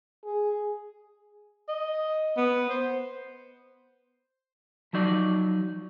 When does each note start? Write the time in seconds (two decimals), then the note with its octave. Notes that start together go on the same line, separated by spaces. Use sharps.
0.25 G#4
1.69 D#5
2.37 B3
2.69 C5
4.93 F3 F#3 D#4 D5